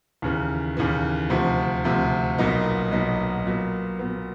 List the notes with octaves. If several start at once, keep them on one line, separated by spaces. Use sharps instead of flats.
D#2 C#3 E3
D#2 C#3 E3
D2 C3 F3
D2 C3 F3
B1 A#2 F#3 B3 D#4
B1 A#2 F#3 B3 D#4
A#2 F#3 B3
A#2 F#3 B3